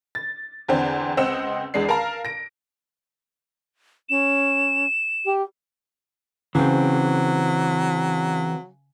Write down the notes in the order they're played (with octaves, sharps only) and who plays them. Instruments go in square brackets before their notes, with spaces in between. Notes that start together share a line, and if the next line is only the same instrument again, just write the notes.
[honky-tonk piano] A6
E2 D3 C4
C#2 C4 D#5 F#5 E6 E7
E2 G#3 D4 C7
A#4 F5 A5 A#5
A#6 D7
[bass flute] C#4 [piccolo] E7
[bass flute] G4
[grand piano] C#3 [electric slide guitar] E3 C4 [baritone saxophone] F#3